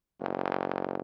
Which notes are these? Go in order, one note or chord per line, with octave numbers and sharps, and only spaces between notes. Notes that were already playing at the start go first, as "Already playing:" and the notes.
F#1